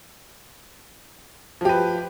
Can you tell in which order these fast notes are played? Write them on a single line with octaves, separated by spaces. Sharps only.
F3 G4 B4